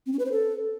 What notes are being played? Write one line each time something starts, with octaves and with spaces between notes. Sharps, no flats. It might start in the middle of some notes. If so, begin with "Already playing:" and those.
C4
C#4
B4
C5
A4